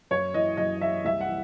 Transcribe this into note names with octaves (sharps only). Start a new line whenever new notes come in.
F#2 C#5
E3 D#5
F#2 D#5
E3 E5
C2 E5
F#5
E3